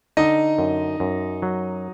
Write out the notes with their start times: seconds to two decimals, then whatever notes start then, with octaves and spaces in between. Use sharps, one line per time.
0.17 D3 D#4 D#5
0.58 F#2
1.00 F#2
1.42 F#3